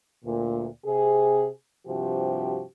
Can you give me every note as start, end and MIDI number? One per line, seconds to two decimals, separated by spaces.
0.25 0.67 38
0.25 0.67 46
0.85 1.48 48
0.85 1.48 68
1.86 2.63 43
1.86 2.63 48
1.86 2.63 53
1.86 2.63 66
1.86 2.63 67